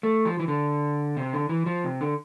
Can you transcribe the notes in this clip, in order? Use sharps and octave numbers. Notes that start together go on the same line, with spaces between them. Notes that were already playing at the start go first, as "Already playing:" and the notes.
A3
F3
E3
D3
C3
D3
E3
F3
C3
D3